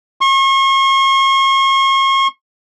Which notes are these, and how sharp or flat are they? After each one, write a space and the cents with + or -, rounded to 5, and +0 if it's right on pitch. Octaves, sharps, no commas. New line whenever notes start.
C#6 -40